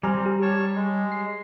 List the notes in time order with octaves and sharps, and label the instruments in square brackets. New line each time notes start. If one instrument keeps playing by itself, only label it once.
[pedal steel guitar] G3 [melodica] C4 [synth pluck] G#5 A#5 F6
[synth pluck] G4
[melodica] C#5 A5 C#6
G#3
[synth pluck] C7